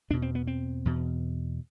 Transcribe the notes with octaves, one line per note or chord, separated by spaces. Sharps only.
E2 B2 D4
C4
B3
C4
E2 B2